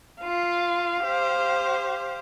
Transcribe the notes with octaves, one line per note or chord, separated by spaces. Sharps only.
F4 F5
G4 C5